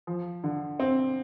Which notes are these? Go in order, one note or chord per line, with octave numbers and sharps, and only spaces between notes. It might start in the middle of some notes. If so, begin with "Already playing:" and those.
F3
D3
C4